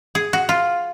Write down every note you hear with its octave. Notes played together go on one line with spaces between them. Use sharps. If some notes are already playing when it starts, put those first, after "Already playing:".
G#4
F#4
F4